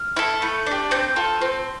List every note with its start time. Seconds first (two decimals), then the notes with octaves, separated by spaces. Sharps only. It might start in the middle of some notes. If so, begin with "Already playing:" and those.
Already playing: F6
0.16 E4 A4
0.42 A3
0.66 D4 G4
0.91 C4 G6
1.16 F4 A4
1.41 C4